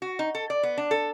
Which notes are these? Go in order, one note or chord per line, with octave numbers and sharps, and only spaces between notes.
F#4
D#4
A4
D5
B3
D4
A4